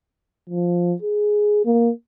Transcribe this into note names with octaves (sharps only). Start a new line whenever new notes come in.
F3
G#4
A#3